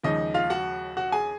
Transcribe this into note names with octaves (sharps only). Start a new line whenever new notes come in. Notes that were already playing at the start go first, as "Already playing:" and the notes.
D#2 C#3 F3 G#3 D#4 D#5
F4 F5
F#4 F#5
F#4 F#5
G#4 G#5